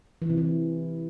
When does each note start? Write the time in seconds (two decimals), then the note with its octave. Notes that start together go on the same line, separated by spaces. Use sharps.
0.22 E3
0.30 C3
0.38 E3